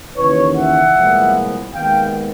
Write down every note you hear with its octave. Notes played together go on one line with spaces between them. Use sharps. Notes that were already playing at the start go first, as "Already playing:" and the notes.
D#2 C#3 E3 B4 C#5
E5 F#5
C2 A#2 F3 G#3 B3
D#2 D#3 G#3 B3 F5 G5